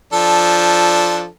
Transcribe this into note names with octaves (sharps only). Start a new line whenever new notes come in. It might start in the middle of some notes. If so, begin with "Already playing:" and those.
F3 D4 A4